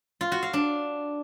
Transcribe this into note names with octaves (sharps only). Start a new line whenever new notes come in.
F4
F#4
F5
D4